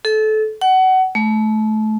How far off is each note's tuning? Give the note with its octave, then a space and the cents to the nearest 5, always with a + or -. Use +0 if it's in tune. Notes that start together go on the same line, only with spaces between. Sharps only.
A4 -25
F#5 +25
A3 -25